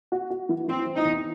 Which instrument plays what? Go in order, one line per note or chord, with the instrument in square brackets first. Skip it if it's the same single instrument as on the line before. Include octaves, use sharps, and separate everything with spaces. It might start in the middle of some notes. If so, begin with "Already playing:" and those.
[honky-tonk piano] F#4
F#4
E3
[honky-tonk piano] E3 [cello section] C4
[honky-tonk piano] E3
[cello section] D#4
[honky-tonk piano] E2